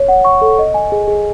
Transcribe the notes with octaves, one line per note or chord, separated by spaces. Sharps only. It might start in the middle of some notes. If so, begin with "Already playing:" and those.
Already playing: C#5
F#5
C#6
A4
D#5
G#5
G#4
G#4